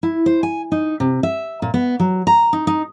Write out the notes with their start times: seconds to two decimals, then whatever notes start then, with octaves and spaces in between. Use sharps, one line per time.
0.03 E4
0.26 C5
0.43 G#5
0.72 D#4
1.00 C3
1.23 E5
1.62 A#2
1.74 B3
2.00 F#3
2.27 A#5
2.53 D#4
2.67 D#4